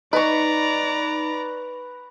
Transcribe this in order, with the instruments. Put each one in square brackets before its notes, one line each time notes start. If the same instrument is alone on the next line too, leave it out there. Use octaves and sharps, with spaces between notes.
[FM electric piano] D#4 [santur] B4 C#6 [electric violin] D5 A#5